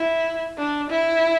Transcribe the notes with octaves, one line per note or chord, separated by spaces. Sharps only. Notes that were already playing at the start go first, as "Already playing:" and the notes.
Already playing: E4
D4
E4